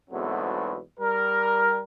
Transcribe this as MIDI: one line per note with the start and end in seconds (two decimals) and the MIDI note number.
0.10 0.78 40
0.10 0.78 44
0.10 0.78 47
0.10 0.78 54
0.10 0.78 57
0.10 0.78 60
1.00 1.81 55
1.00 1.81 70